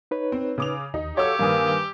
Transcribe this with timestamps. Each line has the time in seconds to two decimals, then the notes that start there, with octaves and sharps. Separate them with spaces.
0.11 D#4 B4 C#5
0.32 C4
0.58 C#3 D6 F7
0.94 D#2 D#4
1.17 F#3 G4 A4 C#5 F5 E6 G#6
1.39 G2 D#3 A#3 B4 G#5 D#6